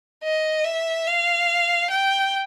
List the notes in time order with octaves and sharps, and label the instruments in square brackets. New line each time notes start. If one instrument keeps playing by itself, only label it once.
[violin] D#5
E5
F5
G5